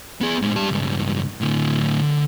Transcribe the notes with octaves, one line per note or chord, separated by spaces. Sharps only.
B3 G#4
A2 G#3
G3 A5
C#2 G2
A2 D3
D3